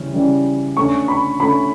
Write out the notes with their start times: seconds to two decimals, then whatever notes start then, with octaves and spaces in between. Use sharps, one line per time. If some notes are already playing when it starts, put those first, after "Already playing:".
Already playing: C#3 E3 G3 C#4
0.13 C#3 E3 G3 C#4
0.76 D3 A3 C#4 C#6
1.08 B5
1.40 D3 A3 C#4 B5